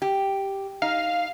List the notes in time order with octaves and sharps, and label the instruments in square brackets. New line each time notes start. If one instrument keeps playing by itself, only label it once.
[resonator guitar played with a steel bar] G4
[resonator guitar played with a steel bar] D#4 [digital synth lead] F5